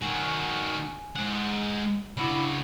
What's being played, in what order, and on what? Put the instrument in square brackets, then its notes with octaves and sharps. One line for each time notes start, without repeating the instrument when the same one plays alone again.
[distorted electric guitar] D#3 F#4 [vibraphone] G#5
[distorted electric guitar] G#3 F#5
[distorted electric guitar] C#3 F#4 [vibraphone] D4 E4 B5